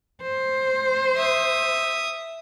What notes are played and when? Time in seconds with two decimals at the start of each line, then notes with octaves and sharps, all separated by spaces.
0.22 C5
1.16 E5 D#6